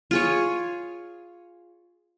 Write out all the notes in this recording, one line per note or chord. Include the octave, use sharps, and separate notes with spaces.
F4 G#4 C#5